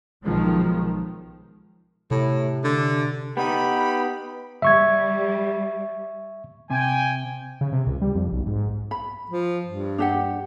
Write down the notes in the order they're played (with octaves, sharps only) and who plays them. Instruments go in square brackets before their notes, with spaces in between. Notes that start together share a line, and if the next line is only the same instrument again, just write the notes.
[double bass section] B1 D#3 F3 G#3
[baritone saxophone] A2 [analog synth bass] C3
[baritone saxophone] D3
[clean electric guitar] B3 D#4 [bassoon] G4 [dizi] B5
[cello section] G3 [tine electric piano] E5 C#6 G#6
[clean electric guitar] C3 [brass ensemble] G5 G#5
[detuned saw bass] C#3
C3
C#2
G3
F2
B1
G#2
[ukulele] B5
[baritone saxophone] F3
G2
[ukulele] D4 G4 F#5